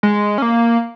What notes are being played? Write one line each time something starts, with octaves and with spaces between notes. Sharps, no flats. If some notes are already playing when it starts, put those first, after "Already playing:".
G#3
C#4
A#3